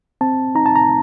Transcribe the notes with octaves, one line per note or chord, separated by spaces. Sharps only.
C4 A5
D#4 A#5
A5
A#5